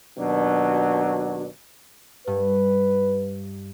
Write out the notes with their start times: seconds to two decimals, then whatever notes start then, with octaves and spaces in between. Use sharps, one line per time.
0.18 D#2 B2 F#3 D4
2.27 G2 B4